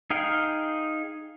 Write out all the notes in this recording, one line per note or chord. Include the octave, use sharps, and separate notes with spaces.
D#4 G#4 F5 G5